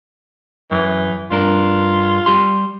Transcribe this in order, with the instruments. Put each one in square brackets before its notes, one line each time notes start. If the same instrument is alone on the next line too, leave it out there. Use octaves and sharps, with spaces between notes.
[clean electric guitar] F#2 [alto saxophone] E3
[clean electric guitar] G2 D4 A#4 [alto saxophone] F4
[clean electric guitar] G3 G4 C6